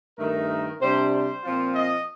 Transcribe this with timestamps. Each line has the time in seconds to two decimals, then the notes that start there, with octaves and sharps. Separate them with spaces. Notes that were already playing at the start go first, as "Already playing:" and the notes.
0.18 G2 D#3 A3 D#4 A#4
0.80 C3 G3 D4 C5
1.12 C5
1.43 A#2 F3 C4 F4
1.75 D#5